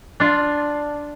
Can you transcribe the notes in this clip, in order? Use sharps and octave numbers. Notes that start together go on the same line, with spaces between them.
D4 F4